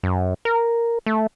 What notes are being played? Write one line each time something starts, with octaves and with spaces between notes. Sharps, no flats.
F#2
A#4
A3